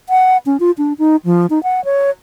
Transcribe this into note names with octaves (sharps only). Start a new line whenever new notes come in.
F#5
C#4
F4
D4
D#4
F3
D#4
F#5
C#5